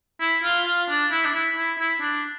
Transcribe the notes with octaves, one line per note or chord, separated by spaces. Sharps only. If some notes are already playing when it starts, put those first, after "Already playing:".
E4
F4
F4
D4
E4
D4
E4
E4
E4
D4